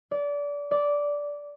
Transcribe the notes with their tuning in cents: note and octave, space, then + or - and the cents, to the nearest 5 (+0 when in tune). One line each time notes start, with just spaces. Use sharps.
D5 -25
D5 -10